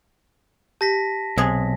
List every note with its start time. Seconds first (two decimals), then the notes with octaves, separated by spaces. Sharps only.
0.81 G4 A5 A#6 B6
1.38 B1 C3 G#3 G#4